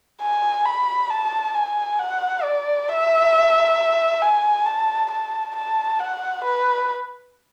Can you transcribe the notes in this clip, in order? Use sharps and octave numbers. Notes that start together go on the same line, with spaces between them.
G#5
B5
A5
G#5
F#5
D5
E5
G#5
A5
A5
A5
F#5
B4